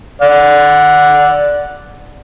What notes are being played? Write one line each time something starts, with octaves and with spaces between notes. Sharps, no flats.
D5 F#5